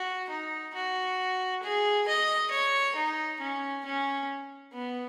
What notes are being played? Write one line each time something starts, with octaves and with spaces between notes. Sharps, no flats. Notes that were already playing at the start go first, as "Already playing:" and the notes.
Already playing: F#4
D#4
F#4
G#4
D#5
C#5
D#4
C#4
C#4
B3